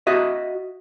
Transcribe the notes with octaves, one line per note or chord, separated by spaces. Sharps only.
F#4 D#5 E5